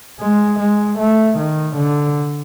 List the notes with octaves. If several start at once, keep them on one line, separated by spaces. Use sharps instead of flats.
G#3
G#3
A3
D#3
D3